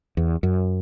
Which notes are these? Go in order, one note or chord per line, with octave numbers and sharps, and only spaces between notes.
E2
F#2